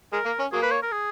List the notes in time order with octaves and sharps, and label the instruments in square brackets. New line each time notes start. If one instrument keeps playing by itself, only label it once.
[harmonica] G#3 [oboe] A#4
[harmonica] A#3
C#4
[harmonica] F#3 A#3 [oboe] G#4
[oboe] B4
C#5
A#4
G#4